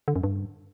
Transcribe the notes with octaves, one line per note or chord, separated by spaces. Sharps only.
D3
F#2
G2